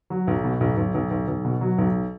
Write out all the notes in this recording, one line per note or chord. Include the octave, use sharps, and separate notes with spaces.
F#3
B1
B2
B1
B1
B1
B1
B1
B2
F#3
B1